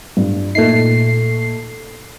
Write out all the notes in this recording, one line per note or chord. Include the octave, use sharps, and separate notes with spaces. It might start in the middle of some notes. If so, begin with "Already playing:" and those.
G2
A#2 A3 D#4 C7